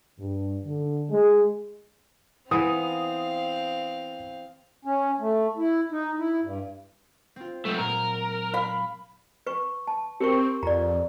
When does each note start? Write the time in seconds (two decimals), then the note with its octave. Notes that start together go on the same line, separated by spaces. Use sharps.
0.19 G2
0.66 D3
1.10 G#3
2.51 E3 B3 C4 F5 D#6
4.85 C#4
5.20 A3
5.57 E4
5.92 D#4
6.19 E4
6.42 G2
7.36 C4 F4
7.65 F#3 G#3 A3 C4
7.78 A#2 A#4
8.54 F5 B5
9.47 B4 C#6
9.87 A5
10.20 C4 G4 A#4 C#6
10.63 F2 D5 A#5